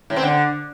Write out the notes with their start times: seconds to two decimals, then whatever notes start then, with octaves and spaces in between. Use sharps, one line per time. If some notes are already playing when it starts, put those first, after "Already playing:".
0.10 A2
0.16 C4
0.23 D3